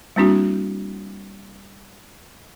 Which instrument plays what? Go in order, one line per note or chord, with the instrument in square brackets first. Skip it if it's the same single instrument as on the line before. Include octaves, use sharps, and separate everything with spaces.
[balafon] G3 A#3 C4 D4 E4 F#4